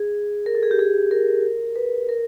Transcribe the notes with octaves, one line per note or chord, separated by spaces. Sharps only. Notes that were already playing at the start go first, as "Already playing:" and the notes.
Already playing: G#4
A#4
A4
G#4
G4
G#4
A#4
B4
A#4